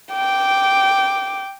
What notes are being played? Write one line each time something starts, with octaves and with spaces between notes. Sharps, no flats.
G5 D6